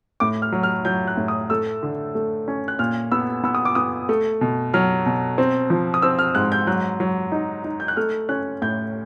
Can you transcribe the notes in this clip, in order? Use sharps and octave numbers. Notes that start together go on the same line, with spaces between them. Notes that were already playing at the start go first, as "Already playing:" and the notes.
A2 D6
F6
F#3
F6
F#3 G6
F#6
A2
D#6
A3 E6
D3
A3
C#4
F#6
A#2 F6
B3 E6
B3 E6
D#6
D6
B3 D#6
A3
B2
F#3 F6
B2
C4
F3
D#6
C4 E6
F6
G#2 F#6
G6
F#3 F#6
F#3
D#4
D#4
G6
F#6
A3 F6
C#4 F#6
A2 G6